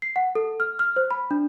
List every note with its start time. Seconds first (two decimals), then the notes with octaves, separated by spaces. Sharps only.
0.02 C7
0.16 F#5
0.35 A4
0.60 F6
0.79 F6
0.96 C5
1.11 B5
1.31 D4